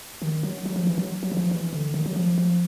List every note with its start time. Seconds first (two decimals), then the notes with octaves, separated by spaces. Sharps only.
0.22 D#3
0.43 F#3
0.65 F#3
0.76 F3
0.87 E3
0.98 F#3
1.23 F#3
1.32 E3
1.37 F3
1.51 E3
1.73 D3
1.94 D#3
2.06 F#3
2.16 F3
2.38 F3